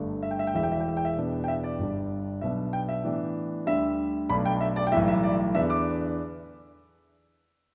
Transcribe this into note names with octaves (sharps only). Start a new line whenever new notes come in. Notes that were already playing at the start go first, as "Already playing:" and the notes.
Already playing: G1 G2 D3 A3
E5
G5
E5
G5
E1 E2 E3 E5
G5
E5
G5
E5
G5
E5
E2 B2 B3 D4
G5
E5
D5
G1 G2 G3 D4
B1 B2 B3 D4 E5
G5
E5
A2 E3 B3 D4
D2 D3 G3 E5
B1 B2 A3 D4 B5
G5
E5
D5
G5
B1 A2 E3 G3 E5
E5
D5
E2 D3 B3 D4 E5
D6